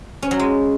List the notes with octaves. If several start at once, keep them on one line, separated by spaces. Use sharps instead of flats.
C#4
F#3
G#3